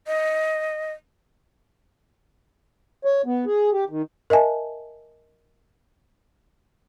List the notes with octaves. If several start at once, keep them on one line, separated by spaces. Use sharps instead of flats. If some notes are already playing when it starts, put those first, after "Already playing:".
D#5
C#5
B3
G#4
G4
D#3
A#4 D#5 E5 G#5 A5